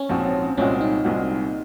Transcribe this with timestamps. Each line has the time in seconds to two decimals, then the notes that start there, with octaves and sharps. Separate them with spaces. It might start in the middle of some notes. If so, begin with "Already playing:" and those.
Already playing: C#4
0.09 A#1 G#2 F3 C4 F#4
0.57 C2 A#2 G#3 C4 C#4 F#4
0.81 D#4
1.04 C2 A#2 G#3 C4 F#4